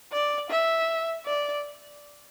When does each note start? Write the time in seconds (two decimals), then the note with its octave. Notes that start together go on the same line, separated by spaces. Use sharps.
0.12 D5
0.50 E5
1.26 D5